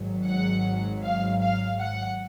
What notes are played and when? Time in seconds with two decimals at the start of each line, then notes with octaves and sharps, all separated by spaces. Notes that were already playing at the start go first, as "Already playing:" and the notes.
Already playing: G#1 G#2 F#3
0.28 F#5
1.04 F5
1.41 F5
1.79 F#5